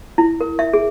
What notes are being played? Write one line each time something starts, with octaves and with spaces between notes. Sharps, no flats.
E4
A#4
E5
G#4